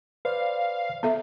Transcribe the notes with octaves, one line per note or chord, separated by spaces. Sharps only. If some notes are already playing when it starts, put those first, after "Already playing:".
B4 C5 D5 F5
B3 A4 E5